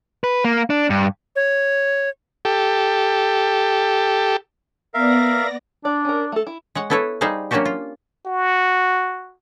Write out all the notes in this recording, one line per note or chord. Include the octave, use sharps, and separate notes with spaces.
B4
A#3
D4
G2
C#5
G4 A4
B3 A#4 D5 E5 F5 A#6
D4 D5
C#4 A#4
A3 A4
E4
G#3 C#5 F#5
B3 E4 A4 B4 C#5
G3 D#4 G#4 C5 F5
F#3 A#3 C#4 D4 F#4 G4
F4
F#4